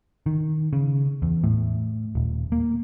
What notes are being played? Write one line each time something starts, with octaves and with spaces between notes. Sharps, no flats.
D#3
C#3
E2
A2
D#1
A#3